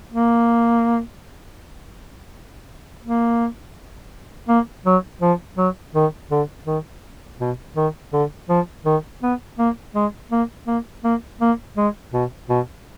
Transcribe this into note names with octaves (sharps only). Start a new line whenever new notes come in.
A#3
A#3
A#3
F#3
F3
F#3
D#3
D3
D#3
B2
D#3
D3
F3
D#3
B3
A#3
G#3
A#3
A#3
A#3
A#3
G#3
B2
B2